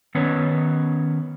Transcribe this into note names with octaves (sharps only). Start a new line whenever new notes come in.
D#3 B3 C#4 B4 C#5